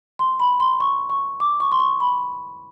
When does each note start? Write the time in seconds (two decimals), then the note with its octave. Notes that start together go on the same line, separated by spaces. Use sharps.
0.19 C6
0.40 B5
0.60 C6
0.80 C#6
1.10 C#6
1.40 D6
1.60 C#6
1.72 C6
1.80 C#6
2.00 B5